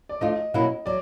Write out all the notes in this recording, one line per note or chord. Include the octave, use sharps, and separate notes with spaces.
D5
F3 A3 D4 F4 D#5
B2 F#3 A#3 C#4 E4
F#3 D5